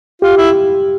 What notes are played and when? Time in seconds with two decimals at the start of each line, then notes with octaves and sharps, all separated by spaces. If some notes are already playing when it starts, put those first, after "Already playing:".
0.22 F4 G4
0.37 E4